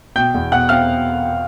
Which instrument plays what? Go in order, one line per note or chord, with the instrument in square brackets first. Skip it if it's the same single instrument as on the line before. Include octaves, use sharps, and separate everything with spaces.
[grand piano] B2 G5 G6
E2
B2 F#5 F#6
C4 F5 F6